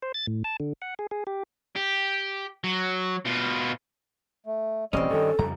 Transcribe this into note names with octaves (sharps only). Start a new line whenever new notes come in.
C5
A6
A2
A5
D3
F#5
G#4
G#4
G4
G4
F#3
B2 F4
A3
E1 A1 E3 G3 C4 C#4 D#5
G2 D#3 A4
F2 C#3 G3 A#5